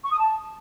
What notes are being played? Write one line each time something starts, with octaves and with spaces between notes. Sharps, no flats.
C#6
D#6
A5